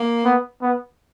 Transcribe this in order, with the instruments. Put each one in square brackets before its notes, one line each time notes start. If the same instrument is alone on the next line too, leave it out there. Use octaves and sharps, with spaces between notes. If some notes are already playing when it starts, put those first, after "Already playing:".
Already playing: [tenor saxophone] A#3
[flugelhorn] B3
B3